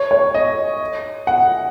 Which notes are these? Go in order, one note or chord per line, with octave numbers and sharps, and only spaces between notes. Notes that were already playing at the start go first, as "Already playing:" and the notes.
Already playing: C#5
C#5
D#5
F#5